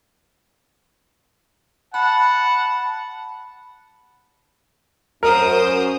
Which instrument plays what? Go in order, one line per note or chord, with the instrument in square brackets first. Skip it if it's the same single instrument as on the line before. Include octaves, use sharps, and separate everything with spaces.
[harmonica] F#5 A5 [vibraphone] B5
[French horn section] F#2 [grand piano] A#4 [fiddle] C5 D#6